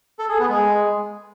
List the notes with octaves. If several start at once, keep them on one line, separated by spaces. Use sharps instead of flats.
A4
G#4
B3
G#3